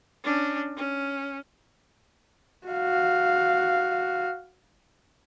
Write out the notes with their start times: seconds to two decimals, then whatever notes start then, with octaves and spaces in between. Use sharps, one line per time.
0.24 C#4 D4
0.77 C#4
2.67 F#4 F5